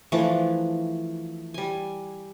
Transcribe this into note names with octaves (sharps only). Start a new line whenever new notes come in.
E3 F3 A3 D4
G3 G#5